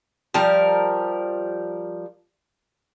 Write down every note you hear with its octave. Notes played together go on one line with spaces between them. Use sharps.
F3 G3 A#4